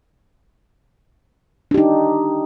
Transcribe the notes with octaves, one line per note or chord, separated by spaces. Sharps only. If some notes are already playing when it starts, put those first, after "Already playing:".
D4 D#4 G4